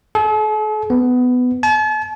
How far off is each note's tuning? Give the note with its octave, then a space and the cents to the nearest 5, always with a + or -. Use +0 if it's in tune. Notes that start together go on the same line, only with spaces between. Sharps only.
A4 -45
B3 +15
A5 -40